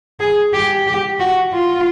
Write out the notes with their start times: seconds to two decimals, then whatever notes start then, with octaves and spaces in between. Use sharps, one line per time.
0.20 G#4
0.53 G4
0.87 G4
1.20 F#4
1.54 F4